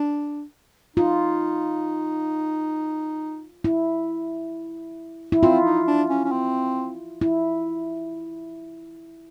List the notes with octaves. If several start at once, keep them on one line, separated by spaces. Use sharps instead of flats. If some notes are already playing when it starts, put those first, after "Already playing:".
Already playing: D4
D#4 F4
E4
E4
C4 F4
D#4
D4
C#4
C#4
C4
E4